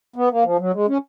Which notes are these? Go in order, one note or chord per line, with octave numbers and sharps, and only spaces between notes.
B3
A#3
F3
F#3
G#3
C#4